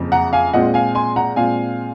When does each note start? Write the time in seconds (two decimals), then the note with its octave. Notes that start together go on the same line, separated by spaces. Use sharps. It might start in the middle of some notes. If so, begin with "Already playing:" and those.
Already playing: F#1 F2 C#3 F3
0.12 F#5 A#5
0.33 F5 G#5
0.53 A#2 G#3 C4 F4 D#5 F#5
0.74 F5 G#5
0.95 G#5 C6
1.16 F#5 A#5
1.36 A#2 G#3 C4 F4 F5 G#5